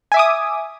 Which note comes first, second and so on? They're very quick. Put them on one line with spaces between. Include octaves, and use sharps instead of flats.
G#5 E5 D6 D#6